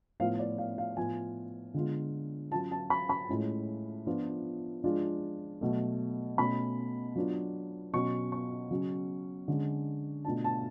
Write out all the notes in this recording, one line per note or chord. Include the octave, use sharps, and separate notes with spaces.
A2 F3 B3 F4 F5
D5
F5
F5
A2 F3 B3 F4 G#5
D3 G#3 B3 F4
F#3 C#4 F4 A5
A5
B5
B5
A2 G#3 C#4 F4
F3 B3 D4 F4
F3 G#3 D4 F4
B2 F#3 A3
B2 A3 C#4 B5
F#3 B3 D4 F4
B2 F#3 C#4 C#6
C#6
C#3 F#3 C#4
D3 G#3 C#4
B2 A3 D4 F4 A5
A5